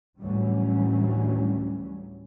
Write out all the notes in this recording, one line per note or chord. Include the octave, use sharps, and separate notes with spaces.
D2 A2 E3 F#3 G3 C#4